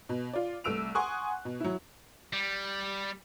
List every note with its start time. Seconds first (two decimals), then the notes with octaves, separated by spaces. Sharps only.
0.09 B2
0.33 F4 D5
0.64 C2 A3 E6 D7 F7
0.95 F#5 G#5 C6 C#6 D#6 F#6
1.45 B2
1.60 F#3 E4
2.33 G3